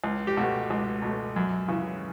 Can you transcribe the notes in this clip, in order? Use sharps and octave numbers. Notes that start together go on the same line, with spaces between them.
C#2
G4
B2 A3 F#4
C#2
B2 A3
F#2
C#3 E3